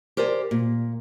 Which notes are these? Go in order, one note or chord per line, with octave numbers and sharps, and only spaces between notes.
G4 A#4 C5 D5 G#5
A#2